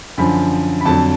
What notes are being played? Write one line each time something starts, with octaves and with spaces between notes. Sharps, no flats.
F#2 D3 F3 B5
B5
F2 D3 F#3 A5